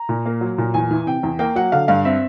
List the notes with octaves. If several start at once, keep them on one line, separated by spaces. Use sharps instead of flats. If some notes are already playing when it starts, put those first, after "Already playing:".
Already playing: A#5
A#2
A#3
F#3
A#2
E2 G#5
E3
C3 G5
E2
A#3 G5
F#3 F#5
D3 F5
G2 F5
C4 E5